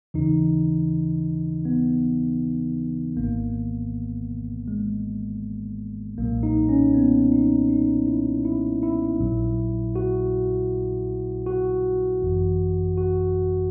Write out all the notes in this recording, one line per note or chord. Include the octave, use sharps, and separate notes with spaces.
D#2 C#3 E3 D#4
B3
G#1 G#2 D#3 A#3
G#3
B1 A#2 F#3 A#3
D#4
C#4
B3
D#4
D#4
E4
E4
E4
A#1 A#2 F#3
F#4
F#4
G#1 F#2 E3
F#4